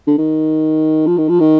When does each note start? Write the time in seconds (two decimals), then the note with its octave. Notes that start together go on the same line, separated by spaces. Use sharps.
0.07 D3
0.18 D#3
1.07 F3
1.18 D#3
1.29 F3
1.40 D#3